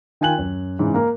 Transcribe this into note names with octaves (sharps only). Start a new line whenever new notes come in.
D#3 F4 G5 G#5 F#6 F#7
F#2
G#2 C#3 E3
A#3 A#4